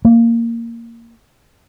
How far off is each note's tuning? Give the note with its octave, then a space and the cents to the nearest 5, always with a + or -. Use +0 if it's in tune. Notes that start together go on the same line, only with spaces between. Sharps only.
A#3 -10